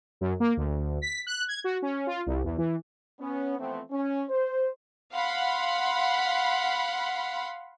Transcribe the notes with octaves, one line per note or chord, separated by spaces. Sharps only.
F#2
A#3
D2
B6
F#6
G#6
F#4
C#4
F4
C2
E2
E3
B3 C#4
E3 F3 A3 B3 C4
C#4
C5
F5 F#5 B5 C6